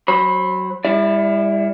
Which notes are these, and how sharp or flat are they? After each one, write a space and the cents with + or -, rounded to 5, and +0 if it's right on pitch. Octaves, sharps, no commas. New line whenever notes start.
F#3 +10 C5 +40 B5 +0
G3 +40 E4 +0 D5 +0